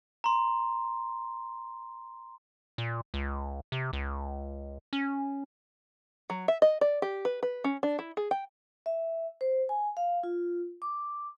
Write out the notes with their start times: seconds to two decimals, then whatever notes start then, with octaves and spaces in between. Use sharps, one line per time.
0.24 A#5 C6
2.78 A#2
3.14 C#2
3.72 C3
3.93 C#2
4.93 C#4
6.30 F#3
6.48 E5
6.62 D#5
6.81 D5
7.02 G4
7.25 B4
7.43 B4
7.64 C#4
7.83 D4
7.99 E4
8.17 G#4
8.31 G5
8.86 E5
9.41 C5
9.69 G#5
9.97 F5
10.23 F4
10.82 D6